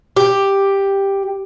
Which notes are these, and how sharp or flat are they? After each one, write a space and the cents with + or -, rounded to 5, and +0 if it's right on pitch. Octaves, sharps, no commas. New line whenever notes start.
G4 +5